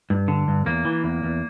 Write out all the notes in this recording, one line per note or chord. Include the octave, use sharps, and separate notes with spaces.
G2
D3
G2
E2 A#3
E3
E2
E2